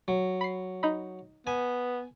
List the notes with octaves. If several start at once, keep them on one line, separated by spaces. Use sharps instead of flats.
F#3
B5 C7
D#4 D#5 B5
B3 G#5